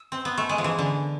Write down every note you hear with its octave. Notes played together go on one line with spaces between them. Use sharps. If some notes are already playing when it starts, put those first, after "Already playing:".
Already playing: D4
C4
B3
A3
G#3
F3
E3
D3